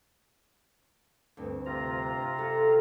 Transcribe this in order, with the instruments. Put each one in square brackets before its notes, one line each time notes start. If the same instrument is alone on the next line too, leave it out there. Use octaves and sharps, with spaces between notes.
[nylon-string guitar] D2 G2 C4
[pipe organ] C3 F4 A#5
[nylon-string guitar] A4